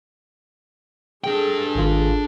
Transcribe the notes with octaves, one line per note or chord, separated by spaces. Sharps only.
D4 G#4 A4 G5
G#1 F4